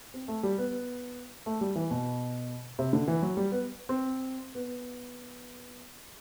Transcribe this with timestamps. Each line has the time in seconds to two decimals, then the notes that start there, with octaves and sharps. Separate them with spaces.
0.14 C4
0.28 A3
0.43 G3
0.58 B3
1.46 A3
1.61 G3
1.76 E3
1.91 B2
2.79 C3
2.93 D3
3.08 E3
3.22 F#3
3.37 G3
3.52 B3
3.89 C4
4.55 B3